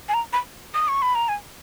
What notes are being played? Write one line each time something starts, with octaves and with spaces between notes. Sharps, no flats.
G#5
A#5
B5
D#6
C#6
B5
A#5
G#5